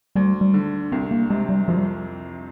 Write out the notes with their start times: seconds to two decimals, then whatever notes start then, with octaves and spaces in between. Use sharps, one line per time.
0.15 D2 G3
0.41 G3
0.54 D3
0.92 C2 C4
1.11 A#3
1.30 C3 G#3
1.49 G3
1.68 F2 F3
1.77 G3